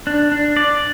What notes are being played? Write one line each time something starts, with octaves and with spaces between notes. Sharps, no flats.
D4
D4
D5